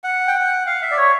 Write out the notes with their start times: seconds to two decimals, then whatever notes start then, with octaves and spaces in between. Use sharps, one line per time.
0.04 F#5
0.27 G5
0.35 F#5
0.66 F5
0.82 E5
0.91 D5
0.98 C#5